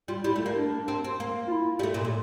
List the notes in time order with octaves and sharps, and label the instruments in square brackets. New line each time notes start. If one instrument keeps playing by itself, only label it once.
[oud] G3 [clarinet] F4
[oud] G3 [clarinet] E4
[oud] A3
A#3
[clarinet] D4
[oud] C4
C4
A#3
[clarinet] F4
E4
[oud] G3
A3
A#2
A2